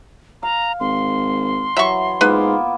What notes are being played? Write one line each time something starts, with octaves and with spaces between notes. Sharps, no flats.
F5 A#5
G#1 C6
E3 F#3 E5 A#5 C#6
G#2 A#3 B3 F4 B4